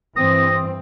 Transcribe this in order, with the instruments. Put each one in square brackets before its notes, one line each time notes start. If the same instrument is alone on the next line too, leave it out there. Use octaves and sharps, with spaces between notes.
[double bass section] G2 E3 C4 [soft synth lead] D#6 [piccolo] A#6